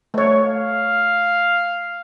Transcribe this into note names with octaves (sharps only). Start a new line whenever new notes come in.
A3 C#5
F5